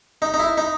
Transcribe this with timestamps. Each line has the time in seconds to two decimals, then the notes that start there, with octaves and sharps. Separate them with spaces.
0.22 D#4
0.34 D#4
0.39 E4
0.58 D#4